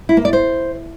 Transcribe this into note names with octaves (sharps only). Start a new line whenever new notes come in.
E4
A#3
D5
C5